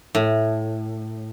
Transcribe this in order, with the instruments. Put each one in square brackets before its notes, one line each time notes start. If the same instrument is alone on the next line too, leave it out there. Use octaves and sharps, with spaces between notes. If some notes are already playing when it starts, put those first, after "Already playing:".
[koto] A2